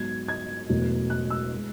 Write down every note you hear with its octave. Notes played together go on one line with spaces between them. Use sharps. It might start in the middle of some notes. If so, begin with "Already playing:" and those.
Already playing: G#2 F#3 B3 G#6
G#6
E1 E2 B2 F#3 A3
F#6
E6
G#3